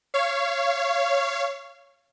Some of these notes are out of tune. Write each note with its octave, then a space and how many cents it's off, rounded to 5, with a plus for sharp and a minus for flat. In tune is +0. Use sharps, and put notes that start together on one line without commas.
C#5 +0 F5 -25